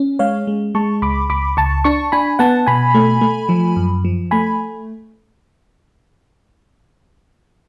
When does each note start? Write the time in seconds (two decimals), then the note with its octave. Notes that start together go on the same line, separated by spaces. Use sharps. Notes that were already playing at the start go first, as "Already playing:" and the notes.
Already playing: C#4
0.19 G#3 C#5 F5
0.47 G#3
0.75 G#3 A5 C#6
1.02 C#2 B5 D6
1.30 C#2 B5 D6
1.57 C#2 A5 C#6
1.84 D4 A5 C#6
2.12 D4 G#5 B5
2.39 B3 F#5 A5
2.67 B2 G#5 B5
2.94 A3
3.21 A3
3.49 F3
3.76 F#2
4.05 F3
4.31 A3 G#5 B5